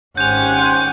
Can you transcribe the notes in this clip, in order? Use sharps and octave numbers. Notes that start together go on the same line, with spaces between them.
G#1 C#4 G4 C5 F#5 G#5 G6 F7